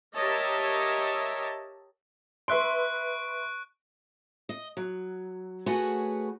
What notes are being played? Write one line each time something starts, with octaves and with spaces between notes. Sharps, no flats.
G4 A#4 C#5 D#5 E5 A5
B4 E5 C6 C#6 F#6 D7
D#5
F#3
A3 F#4 G#4 B4 C#5 F#5